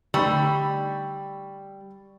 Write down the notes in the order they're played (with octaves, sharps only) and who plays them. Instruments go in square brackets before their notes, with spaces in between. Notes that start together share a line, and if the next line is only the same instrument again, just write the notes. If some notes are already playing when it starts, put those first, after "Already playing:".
[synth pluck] D3 A3 D#4 [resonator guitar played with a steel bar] G3 [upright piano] B5 C#6 E6